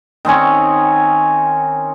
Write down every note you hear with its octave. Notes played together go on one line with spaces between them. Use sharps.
D#3 C4 C#4 C#5